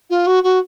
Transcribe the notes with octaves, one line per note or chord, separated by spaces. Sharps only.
F4
F#4
F#4